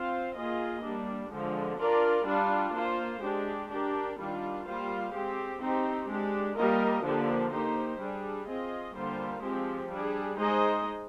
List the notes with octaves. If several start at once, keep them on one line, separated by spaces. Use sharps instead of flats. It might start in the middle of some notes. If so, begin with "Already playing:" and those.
Already playing: C4 F4 C5 F5
A#3 F4 G#4 D#5
G3 A#3 D4
D3 F3 G#3
D4 F4 A#4 D5
G3 D4 F4
A#3 F4 C5
G#3 D4 G4
D4 G4 A#4
D#3 G3 D4 F4
G3 A#3 F4 C5 F5
G#3 C4 G4
C4 D#4 G4
G#3 D4 G4
G3 A#3 F4 A#4 D#5
D3 F3 A#3 D4 G4
A#3 D#4 G4 C5
G3 D4 G#4
C4 F4 G#4 D#5
D3 G3 A#3 F4 C5
F3 G#3 C4 G4
G3 D4 G#4
G#3 D#4 G#4 C5 D#5